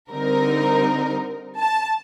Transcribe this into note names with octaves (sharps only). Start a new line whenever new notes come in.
D3 G3 C4 D#4 A#4
A5